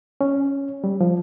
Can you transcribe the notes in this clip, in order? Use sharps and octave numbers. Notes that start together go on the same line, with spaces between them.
C#4
G3
F3